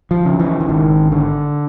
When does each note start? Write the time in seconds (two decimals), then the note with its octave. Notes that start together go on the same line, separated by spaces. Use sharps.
0.11 F3
0.25 C#3
0.39 E3
0.60 E3
0.69 G#1 D#3
1.12 D3